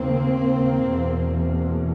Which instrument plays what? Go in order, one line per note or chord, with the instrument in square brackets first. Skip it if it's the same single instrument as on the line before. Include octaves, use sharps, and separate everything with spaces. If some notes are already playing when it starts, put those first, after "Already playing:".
Already playing: [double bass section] D#2 C#3 A#3 C4
E2 B2